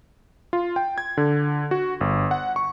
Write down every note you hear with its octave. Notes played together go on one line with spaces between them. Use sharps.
F4
G5
G#6
D3
F#4
G1
F#5
C#6